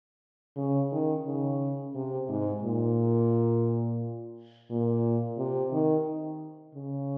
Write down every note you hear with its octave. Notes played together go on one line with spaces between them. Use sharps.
C#3
D#3
C#3
C3
G#2
A#2
A#2
C3
D#3
C#3